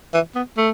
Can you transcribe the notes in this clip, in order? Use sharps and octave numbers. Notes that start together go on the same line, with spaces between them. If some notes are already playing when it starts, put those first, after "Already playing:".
E3
B3
A3